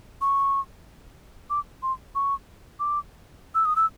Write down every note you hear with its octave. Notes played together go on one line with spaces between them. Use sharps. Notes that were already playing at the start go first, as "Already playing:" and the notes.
C#6
D6
C6
C#6
D6
E6
D#6
E6